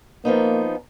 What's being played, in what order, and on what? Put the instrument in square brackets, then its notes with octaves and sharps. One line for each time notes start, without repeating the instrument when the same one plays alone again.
[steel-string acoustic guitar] F3 B3 D#4 [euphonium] A#3